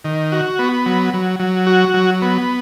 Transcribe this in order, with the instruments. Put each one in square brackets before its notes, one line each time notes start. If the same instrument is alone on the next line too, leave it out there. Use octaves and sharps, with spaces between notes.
[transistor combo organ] D#3
F#4
B3
F#3
F#3
F#3
F#4
F#3
B3